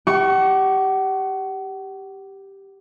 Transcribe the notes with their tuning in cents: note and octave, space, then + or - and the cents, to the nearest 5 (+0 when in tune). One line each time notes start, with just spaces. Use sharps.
G4 +0 F#5 +40 C#6 +0